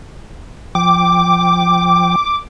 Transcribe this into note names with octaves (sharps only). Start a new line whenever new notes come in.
F3 G5 D6